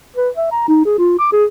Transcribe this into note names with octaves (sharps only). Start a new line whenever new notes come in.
B4
E5
A#5
D#4
G#4
F4
D6
G#4